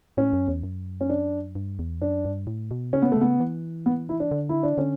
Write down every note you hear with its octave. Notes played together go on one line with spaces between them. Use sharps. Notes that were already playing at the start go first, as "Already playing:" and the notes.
A2 C#4
F#2
E2
F#2
C#4
D4
G2
E2
F#2 D4
G2
A2
B2
C#3 C#4
B3
A3
C#3 B3
E3
B3
E4
D4
D3
E4
D4
D3 C#4